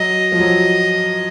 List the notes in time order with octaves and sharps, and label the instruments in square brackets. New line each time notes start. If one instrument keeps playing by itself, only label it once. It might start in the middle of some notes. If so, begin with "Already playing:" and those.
Already playing: [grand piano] F#3 [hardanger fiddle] D#5
[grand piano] F3
F#3